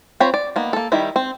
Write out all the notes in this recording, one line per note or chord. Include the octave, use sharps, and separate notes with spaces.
C4 F4 C5 C#5 B5
D5
D#3 A#3 B3
A#3 A4
D#3 G3 E4 E5
C4